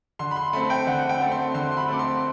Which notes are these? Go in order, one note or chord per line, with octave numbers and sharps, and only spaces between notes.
D3 C6
B5
C6
A3 C4 B5
G5
D3 F#5
G5
A3 C4
C6
D3 C6
C6
B5
A3 C4 D6
C6